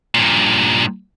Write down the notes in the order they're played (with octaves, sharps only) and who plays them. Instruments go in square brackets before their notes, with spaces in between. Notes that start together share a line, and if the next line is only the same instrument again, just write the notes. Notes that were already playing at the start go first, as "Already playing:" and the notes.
[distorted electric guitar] G2 A#2